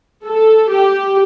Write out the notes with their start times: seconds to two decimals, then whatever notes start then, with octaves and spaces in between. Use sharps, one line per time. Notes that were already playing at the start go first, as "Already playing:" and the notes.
0.25 A4
0.71 G4